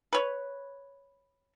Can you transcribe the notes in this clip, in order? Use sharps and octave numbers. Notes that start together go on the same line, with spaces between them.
B4 C#5